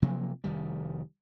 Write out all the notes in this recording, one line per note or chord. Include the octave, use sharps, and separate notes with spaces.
C3 F3 F#3 A#3
F1 D#3 G3